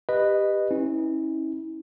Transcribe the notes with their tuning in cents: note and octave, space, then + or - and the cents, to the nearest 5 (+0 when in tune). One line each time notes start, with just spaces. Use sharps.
G4 +10 B4 +0 D#5 -15
C#4 -25 E4 -35